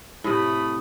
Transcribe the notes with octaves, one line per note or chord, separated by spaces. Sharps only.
A2 C3 A3 B5 D#6